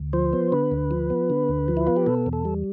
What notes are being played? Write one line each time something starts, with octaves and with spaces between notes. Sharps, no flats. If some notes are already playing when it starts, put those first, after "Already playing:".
Already playing: D2
F3 C5
B3
D3 B4
D2
F3
B3
D3
D2
F3
E4
B3 F4
G4
B2 A4
E2
A4
G3